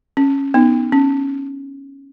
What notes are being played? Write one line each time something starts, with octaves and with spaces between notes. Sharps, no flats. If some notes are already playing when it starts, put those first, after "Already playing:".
C#4
B3 D#4
C#4